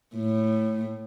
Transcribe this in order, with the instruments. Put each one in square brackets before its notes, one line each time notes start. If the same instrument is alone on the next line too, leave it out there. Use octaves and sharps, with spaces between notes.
[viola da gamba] A2